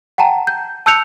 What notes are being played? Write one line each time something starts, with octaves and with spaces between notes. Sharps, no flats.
F#5 G5 A5 A#5
G6
A5 E6 F#6 G6 C#7 F7